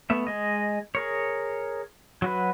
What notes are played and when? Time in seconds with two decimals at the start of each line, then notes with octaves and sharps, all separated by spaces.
0.10 A3 B3 E5
0.27 G#3 D#5
0.95 G#4 A#4 C#5
2.22 F#3 F#4 B4